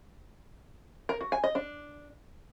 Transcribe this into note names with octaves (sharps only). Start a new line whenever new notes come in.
A#4
F#4
G#5
D#5
D4